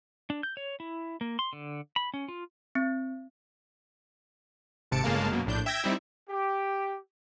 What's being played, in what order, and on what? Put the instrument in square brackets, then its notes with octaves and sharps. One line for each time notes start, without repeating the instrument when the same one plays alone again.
[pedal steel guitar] D4
G6
C#5
E4
A#3
C6
D3
B5
C#4
F4
[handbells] C4
[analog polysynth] G#1 C3 A5 C#7 D7
G1 C#3 G#3 A#3 F5 A5
F#2 B2 A#3
A#1 A2 D4 G6
E5 G5 E6 G6 G#6 A#6
G3 C4 D#4 E4 E5
[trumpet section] G4